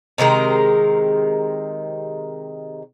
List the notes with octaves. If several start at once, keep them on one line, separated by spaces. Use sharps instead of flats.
C3 D#3 G#3 A#4